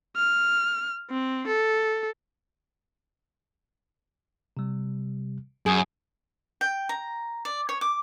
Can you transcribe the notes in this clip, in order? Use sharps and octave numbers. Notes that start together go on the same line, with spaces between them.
F6
C4
A4
C3 G3
F#2 G#4
G5
A#5
D5
C#5
D6